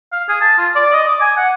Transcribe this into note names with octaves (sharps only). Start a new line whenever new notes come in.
F5
G#4
A5
F4
D5
D#5
D6
G#5
F#5